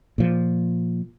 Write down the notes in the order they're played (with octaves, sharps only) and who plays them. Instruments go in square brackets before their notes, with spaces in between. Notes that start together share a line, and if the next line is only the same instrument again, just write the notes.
[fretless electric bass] A#2 F3